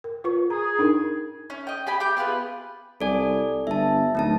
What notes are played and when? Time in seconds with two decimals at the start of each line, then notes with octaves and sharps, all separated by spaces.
0.04 A#4
0.24 F4 B4 C#6
0.50 G#4 A#5
0.79 D4 D#4 A#4
1.50 C#4
1.67 D#5 G5
1.87 G4 G5 G#5 B5
2.00 G4 G5 G6
2.17 B3 F4 G#4 B4
3.01 C2 A4 D5 G#5
3.67 G1 E5 A5
4.15 D1 A3 D#4 A5